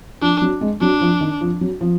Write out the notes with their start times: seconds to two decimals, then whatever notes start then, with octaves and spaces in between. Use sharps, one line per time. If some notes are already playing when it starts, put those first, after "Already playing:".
0.22 F3 D4
0.42 F#3
0.61 G#3
0.81 F#3 D4
1.01 F3
1.21 D#3
1.41 F3
1.61 F#3
1.81 F3